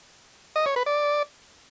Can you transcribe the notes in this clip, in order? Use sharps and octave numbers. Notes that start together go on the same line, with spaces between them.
D#5
C#5
B4
D5